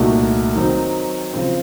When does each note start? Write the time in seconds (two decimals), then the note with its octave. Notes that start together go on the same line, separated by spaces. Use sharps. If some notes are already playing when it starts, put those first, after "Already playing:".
Already playing: C2 A#2 A3 D#4 F#4
0.55 D#3 F#3 C4 D#4
1.34 C#3 F3 C4